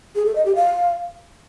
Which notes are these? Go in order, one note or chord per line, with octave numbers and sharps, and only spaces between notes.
G#4
A4
D#5
G4
F5